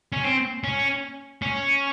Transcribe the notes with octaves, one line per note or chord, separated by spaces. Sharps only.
C#4
C4
C#4
C#4